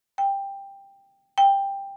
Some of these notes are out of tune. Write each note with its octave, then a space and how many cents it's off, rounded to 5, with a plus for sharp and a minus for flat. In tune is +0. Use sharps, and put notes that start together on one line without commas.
G5 +10
G5 +10